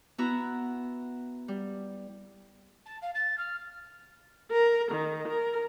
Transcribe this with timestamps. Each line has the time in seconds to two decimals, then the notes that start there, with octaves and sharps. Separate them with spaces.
0.18 B3 E4 F#4 A#5 E6
1.48 G3
2.85 A5
3.02 F5
3.14 A6
3.38 F6
4.51 A#4
4.91 D#3
5.27 A#4